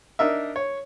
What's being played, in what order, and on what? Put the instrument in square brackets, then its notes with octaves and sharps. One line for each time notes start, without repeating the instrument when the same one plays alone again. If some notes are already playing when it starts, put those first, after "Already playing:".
[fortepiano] D4 D#4 A#4 D#5 E5
C#5